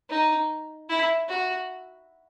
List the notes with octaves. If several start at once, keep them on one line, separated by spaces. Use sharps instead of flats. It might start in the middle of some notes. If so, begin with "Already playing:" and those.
D#4
E4
F#4